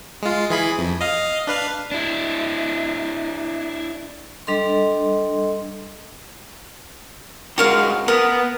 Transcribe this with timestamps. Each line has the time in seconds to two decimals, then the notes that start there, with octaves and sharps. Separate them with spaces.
0.22 G#3 F4
0.50 E3 G#4 B5
0.78 F2
1.01 D#5 F5
1.47 D4 B4 F5
1.92 D4 E4
4.47 G3 D4 A4 D#5 C6
7.58 D3 G#3 F#4 A#4 F5
8.08 B3 A#4